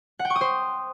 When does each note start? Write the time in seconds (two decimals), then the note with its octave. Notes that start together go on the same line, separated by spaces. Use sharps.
0.19 F#5
0.25 G5
0.30 C#6
0.36 D#6
0.41 C5